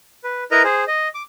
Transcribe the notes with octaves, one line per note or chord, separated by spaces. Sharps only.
B4
E4 A#4 B4 D#5 A#5
G#4 C5
D#5
D6